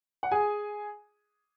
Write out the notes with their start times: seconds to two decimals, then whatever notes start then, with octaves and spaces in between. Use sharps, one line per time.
0.23 F#5
0.31 G#4 G#5